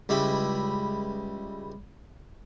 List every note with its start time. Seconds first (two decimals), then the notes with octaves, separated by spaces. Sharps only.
0.09 C#2 G3 E4 B5